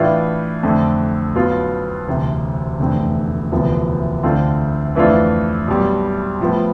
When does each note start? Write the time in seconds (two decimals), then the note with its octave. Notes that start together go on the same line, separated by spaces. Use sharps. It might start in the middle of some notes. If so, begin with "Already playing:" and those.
Already playing: A2 E3 A3 D4 F4
0.63 F2 D3 A3
1.35 B1 B2 B3 F4
2.08 E1 D2 C3
2.79 F1 E2 D3 A3 C4
3.51 E1 D2 C3 F3 B3
4.23 D2 D3 A3 C4 F4
4.95 F2 E3 A3 D4 F4
5.68 B1 B2 G3
6.40 A2 F3 B3